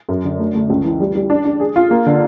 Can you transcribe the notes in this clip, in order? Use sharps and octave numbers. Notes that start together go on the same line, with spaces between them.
F#2
D3
A3
A3
C#2
E3
G3
G3
D4
D4
G#4
F4
A#3
D3